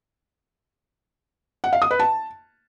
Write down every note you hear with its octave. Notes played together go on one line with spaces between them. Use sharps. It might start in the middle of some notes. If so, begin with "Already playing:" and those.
F#5
F5
D#6
B4
A5